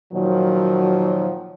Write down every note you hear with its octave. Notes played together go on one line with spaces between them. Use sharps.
A#2 D#3 F3 F#3